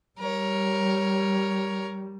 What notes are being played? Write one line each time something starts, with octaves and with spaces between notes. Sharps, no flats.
G3 A#4 C#5